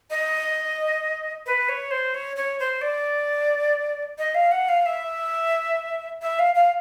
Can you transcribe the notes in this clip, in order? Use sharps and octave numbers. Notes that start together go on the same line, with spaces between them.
D#5
B4
C#5
C5
C#5
C#5
C5
D5
D#5
F5
F#5
F5
E5
E5
F5
F5